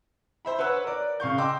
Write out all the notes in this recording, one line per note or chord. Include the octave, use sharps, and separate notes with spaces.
C5 E5 B5
B4 C#5 F#5 E6 F#6
A#4 D5
C#3 F5 C#6 G6
D#5 G5 C6 D6 E6